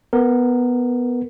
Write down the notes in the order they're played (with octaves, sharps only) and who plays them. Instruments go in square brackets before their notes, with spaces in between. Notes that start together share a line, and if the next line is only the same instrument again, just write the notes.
[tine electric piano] B3 A#4